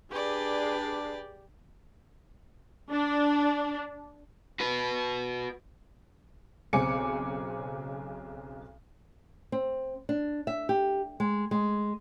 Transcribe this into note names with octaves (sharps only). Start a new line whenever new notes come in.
D4 G4 G#4 B4 D5
D4
F#4 B4
B1 C#3 C4 G#5 D6 C#7
C4
D4
E5
G4
G#3
G#3